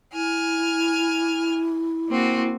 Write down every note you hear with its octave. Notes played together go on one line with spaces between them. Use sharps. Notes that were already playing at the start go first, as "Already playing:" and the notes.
E4 G#5 F6
A#3 C4 F#4